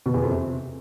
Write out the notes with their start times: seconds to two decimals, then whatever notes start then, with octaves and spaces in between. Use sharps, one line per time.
0.06 B2
0.14 E2
0.22 F2
0.31 C3